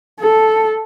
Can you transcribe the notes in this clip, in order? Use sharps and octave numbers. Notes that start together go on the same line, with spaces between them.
A4